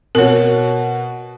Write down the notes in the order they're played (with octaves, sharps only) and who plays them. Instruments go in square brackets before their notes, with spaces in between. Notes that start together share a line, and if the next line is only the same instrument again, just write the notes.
[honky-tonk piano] B2 F#4 [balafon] A#4 C#5